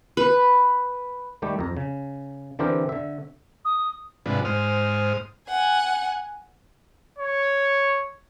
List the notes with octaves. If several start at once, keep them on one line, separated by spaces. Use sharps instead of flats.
B4
D#3 G3 A3 G4
F2 A#5
C#3
D3 E3 C4 D4 G4 A#4
D3 E5
D#6
G#2 C3 F3 D4 B4
G#2 C5 D#6 F6
F#5 G#5
C#5